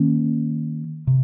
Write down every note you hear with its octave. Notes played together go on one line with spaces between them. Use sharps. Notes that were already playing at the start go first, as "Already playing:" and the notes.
Already playing: D#3 A#3 C#4
C3